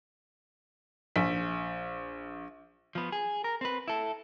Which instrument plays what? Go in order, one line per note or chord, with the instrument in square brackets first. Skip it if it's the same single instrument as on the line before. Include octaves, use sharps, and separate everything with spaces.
[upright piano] A#1 B6
[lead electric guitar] F3 B3
G#4
A#4
C4 B4
E4 A4